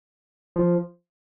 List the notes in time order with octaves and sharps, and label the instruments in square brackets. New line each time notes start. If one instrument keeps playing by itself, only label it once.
[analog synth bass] F3